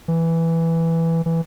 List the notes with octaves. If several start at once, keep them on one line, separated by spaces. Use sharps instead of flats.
E3
E3